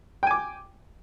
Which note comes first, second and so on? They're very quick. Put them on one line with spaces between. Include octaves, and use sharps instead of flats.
G5 G#5 D6